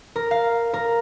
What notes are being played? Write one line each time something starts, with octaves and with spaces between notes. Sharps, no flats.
A#4
F5
A#4